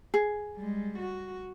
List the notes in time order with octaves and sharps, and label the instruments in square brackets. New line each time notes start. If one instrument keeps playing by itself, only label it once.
[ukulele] G#4
[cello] G3 G#3
F#4